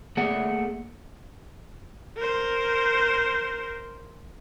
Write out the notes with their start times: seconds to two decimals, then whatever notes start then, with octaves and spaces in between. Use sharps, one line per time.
0.17 A3 A#3 G#4 D5 E5 F#5
2.17 A#4 C5